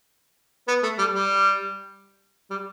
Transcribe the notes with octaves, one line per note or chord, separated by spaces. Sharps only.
B3
A3
G3
G3
G3